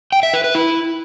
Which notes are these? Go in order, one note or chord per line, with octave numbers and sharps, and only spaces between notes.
G5
E5
B4
B4
E4